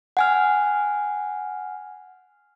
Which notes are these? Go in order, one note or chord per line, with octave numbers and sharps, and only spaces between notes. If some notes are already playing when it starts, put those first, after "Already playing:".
F#5 G#5 F6